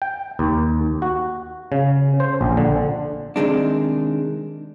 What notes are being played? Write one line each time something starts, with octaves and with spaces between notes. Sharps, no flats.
G5
D#2
F#4
C#3
C5
A#1
D3
C3 D#3 G#3 D4